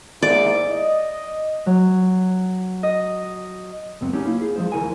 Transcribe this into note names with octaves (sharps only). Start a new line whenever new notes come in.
G#2 A#3 E4 D5
D#5
F#3
D#5
C#2 F#2 B3 C4
A3 B3 C#4 D#4 G4
A#3 E4 F4
G#4
F3 G#3 C5
D2 F#3 E4 A4 A#4 G#5